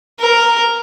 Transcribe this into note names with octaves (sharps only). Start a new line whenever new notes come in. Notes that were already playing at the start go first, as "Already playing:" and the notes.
A#4